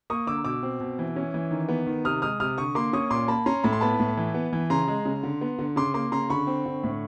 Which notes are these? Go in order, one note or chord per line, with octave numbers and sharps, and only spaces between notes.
A#3 C#6 D#6
D3 D6 E6
B2 D6 E6
C4
B2
E3
C#4
E3
D#3
B3
D#3
C3 D#6 F6
G#3 D#6 F6
C3 D#6 F6
D3 C#6 D#6
A#3 C6 D6
C#4 C#6 D#6
A#2 C6 D6
A#3 A5 B5
C#4 A#5 C6
A2 B5
C6
B3 A5 B5
A2
E3
B3
E3
C#3 A#5 C6
G#3
C#3
D3
B3
D3
C#3 C6 D6
A#3 C6 D6
C#3 A#5 C6
D3 B5 C#6
C4
D3
A2